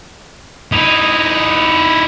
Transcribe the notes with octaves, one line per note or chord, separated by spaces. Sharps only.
D#4 E4